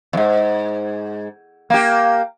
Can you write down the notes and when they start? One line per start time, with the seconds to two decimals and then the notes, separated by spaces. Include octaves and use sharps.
0.13 E2 G#2
1.70 A#3 G4